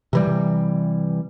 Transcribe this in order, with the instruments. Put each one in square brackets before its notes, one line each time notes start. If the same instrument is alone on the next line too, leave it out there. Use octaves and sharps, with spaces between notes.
[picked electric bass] C3 E3 G3